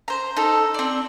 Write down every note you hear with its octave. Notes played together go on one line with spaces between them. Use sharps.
C5 A#5
D#4 A4
C4 D5